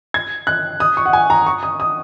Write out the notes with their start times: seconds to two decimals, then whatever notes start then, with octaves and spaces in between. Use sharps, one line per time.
0.14 G#6
0.47 F#6
0.80 D#6
0.97 C#6
1.06 F#5
1.13 G#5
1.30 A#5
1.47 C#6
1.63 D#6
1.80 D#6